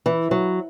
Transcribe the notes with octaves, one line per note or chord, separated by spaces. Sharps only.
E3
F#3